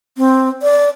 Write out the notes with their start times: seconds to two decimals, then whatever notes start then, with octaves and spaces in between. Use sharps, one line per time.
0.18 C4
0.62 D5